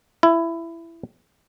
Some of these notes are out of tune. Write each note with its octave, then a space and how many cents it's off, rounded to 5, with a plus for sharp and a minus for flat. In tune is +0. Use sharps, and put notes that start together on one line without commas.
E4 +15